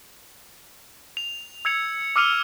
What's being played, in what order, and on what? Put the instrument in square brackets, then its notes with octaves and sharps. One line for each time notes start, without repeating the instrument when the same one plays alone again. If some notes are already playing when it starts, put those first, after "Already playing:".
[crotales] F7
E6 G#6 C#7 F7
D6 E6 F6 C#7 D#7 F7